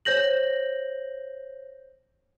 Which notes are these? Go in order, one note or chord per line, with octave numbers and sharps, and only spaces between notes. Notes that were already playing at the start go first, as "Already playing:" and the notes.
C5 C#5 G6 A#6 F#7